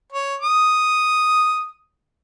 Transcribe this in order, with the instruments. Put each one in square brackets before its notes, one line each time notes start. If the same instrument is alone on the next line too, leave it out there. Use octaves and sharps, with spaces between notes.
[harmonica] C#5
D#6